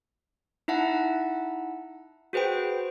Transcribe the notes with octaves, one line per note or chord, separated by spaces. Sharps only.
D#4 E4 E5 F#5 A5
F#4 G#4 B4 C5 G5